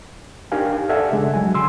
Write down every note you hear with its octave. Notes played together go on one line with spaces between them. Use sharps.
D4 D#4 G4 A#4 F5 G#5
A4 D5 E5 F#5 G#5
C#3 G#3 D4
F#3 G#5
D3 C6 E6